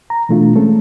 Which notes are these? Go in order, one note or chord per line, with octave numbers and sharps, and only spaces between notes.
A#5
B2 E3 A3 D4 F4
G#3 A3 C4 C#4 A4